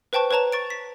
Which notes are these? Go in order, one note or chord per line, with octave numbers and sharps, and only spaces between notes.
B4 C5 G5 A5 C#6
B4 C#5 A5 A#5 E7
C#6 A6 D7
B6